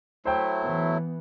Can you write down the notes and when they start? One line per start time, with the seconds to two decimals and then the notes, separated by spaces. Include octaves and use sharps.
0.25 F#3 A3 E4 C5 G5
0.63 E3 B3